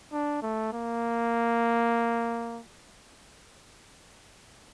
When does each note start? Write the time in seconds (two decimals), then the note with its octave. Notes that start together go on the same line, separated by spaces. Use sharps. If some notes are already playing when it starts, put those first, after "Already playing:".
0.12 D4
0.42 A3
0.73 A#3